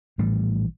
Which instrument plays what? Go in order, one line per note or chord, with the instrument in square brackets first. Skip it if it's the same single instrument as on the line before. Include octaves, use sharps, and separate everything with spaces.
[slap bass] A#1 A2 E3 G3